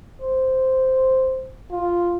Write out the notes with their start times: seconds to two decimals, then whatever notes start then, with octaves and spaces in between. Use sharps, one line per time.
0.21 C5
1.72 F4